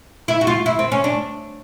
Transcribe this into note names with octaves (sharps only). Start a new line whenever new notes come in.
E4
F#4
F4
E4
C4
C#4
D4